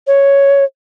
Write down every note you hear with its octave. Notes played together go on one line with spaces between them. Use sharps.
C#5